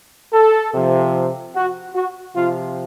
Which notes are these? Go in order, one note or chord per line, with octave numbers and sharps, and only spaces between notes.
A4
C3 F3
F#4
F#4
C3 F3 F4